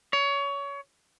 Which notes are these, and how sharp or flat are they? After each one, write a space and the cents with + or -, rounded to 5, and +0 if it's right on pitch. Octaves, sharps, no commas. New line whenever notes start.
C#5 +25